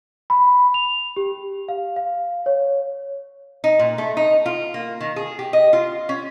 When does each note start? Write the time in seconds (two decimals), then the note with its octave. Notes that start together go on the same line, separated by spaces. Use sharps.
0.30 B5
0.74 F7
1.17 G4
1.68 F5
1.96 F5
2.46 C#5
3.64 D#4
3.79 A#2
3.98 A3
4.17 D#4
4.46 F4
4.74 A#3
5.00 D#3
5.16 G#4
5.39 G4
5.53 D#5
5.73 F4
6.09 C#4